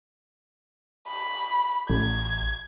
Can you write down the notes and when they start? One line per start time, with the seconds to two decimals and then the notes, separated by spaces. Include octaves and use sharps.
1.08 B5
1.90 A1 G#6